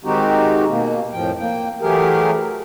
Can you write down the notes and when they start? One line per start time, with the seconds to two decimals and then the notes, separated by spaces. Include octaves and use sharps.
0.04 D#3 G#3 C4 D#4 F#4 G4
0.69 B2 A#3
1.13 F2 A2 F3 G5
1.38 A#3 G5
1.81 E3 F#3 A3 G4 G#4 A#4